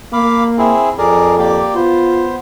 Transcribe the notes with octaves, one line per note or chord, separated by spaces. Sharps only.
A#3 F5 B5 D6
C4 E4 G#4
F2 G#4 A#4 D5
A#3 G4 D5
B3 F4 C5